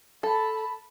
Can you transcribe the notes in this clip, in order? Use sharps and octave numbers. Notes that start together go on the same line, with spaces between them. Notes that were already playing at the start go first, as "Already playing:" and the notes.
A4 A5 B5